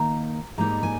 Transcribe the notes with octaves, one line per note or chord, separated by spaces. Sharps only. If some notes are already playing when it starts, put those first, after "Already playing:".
Already playing: D#3 A#3 D#4 A#5
G#2 G3 A#3 D#4 A#5
G#5